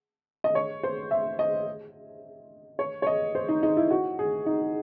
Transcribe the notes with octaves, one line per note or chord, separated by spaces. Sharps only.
D#5
C#5
C5
E5
D#5
C#5
C#5
D#5
C5
D#4
D#4
E4
F#4
G#4
D#4